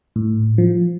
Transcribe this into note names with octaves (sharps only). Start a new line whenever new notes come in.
A2
F3